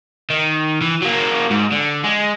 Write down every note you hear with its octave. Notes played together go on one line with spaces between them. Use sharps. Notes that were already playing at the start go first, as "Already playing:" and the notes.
D#3
E3
F#3 A#3
G#2
D3
G#3